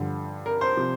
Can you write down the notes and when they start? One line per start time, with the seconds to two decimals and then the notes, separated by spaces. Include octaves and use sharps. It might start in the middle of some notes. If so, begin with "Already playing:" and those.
Already playing: G2 D3 F3
0.46 A#4
0.61 C5
0.77 C3 F3